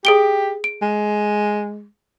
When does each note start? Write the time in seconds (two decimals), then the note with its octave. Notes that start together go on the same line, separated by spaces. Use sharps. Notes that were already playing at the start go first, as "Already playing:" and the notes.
0.05 G4 G#4 D7 G7
0.64 D7
0.82 G#3